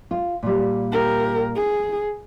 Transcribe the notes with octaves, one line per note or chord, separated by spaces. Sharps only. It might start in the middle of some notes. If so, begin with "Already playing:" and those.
F4
A#2 G3
G4 A#4
G#4